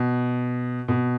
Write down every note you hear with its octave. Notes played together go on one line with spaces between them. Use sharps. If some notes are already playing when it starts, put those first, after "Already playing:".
Already playing: B2
B2